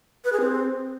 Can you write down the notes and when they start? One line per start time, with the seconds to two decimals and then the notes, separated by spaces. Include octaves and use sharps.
0.25 B4
0.33 G#4
0.40 C4